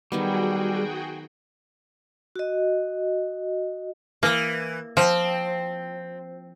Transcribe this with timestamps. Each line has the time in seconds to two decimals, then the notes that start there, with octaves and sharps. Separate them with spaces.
0.12 D#3 F#3 G3 B3 F#4 G#4 G5
2.36 F#4 D#5
4.23 E3 A#3
4.97 F3 C4